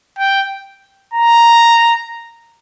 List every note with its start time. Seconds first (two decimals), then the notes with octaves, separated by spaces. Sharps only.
0.19 G5
1.14 A#5